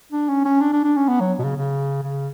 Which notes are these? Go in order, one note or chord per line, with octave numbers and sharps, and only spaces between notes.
D4
C#4
C#4
D4
D4
D4
C#4
B3
F#3
B2
C#3
C#3
C#3